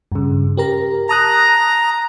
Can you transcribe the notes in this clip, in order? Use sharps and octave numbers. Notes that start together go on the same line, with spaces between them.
G2 C#3
G4 A#4 A#5
A5 A#5 D#6 F#6